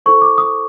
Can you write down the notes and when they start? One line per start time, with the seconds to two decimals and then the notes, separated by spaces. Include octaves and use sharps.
0.06 E4 A4 C5 C#6
0.22 D6
0.38 D#6